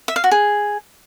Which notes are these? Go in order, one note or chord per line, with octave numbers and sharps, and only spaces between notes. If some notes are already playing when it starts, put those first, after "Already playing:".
E5
F5
F#4
G#4